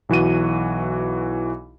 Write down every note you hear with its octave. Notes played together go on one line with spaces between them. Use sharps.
B1 E3 F#4 D#7